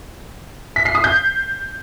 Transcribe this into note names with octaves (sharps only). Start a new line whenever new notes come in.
B6
C7
D#6
G6